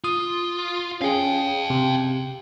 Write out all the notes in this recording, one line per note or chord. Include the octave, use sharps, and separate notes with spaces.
F4 D#6
C#4 G#4 F5 G5
C3